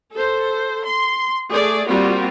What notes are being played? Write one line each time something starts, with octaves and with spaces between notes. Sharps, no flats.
A4 C5
C6
A3 G#4 D5
G3 A#3 C4 F4 F#4